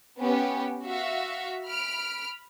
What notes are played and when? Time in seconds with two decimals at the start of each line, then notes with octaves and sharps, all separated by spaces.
0.20 B3 C#4 G4
0.84 F#4 E5 F5
1.65 B5 F6 D7